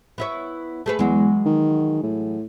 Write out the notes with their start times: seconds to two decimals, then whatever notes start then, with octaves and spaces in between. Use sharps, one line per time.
0.18 B3 E4 C#5
0.86 A3 G#4 B4
0.99 E2 E3 F#3 G#3
1.46 D#3
2.03 A2